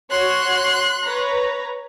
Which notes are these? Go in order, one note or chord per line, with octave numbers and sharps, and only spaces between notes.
F#4 C#5 C6 F#6
B4 C#5 A#5